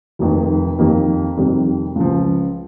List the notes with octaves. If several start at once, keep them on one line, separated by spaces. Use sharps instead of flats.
F1 F2 D#3
F2 D#3 A#3 D#4 G4
F2 C3 D#3 G3
C#2 C#3 F3